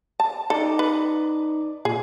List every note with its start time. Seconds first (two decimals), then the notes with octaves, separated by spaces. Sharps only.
0.20 A5
0.50 D#4 A4 D5
0.79 B4
1.85 A#2 G#4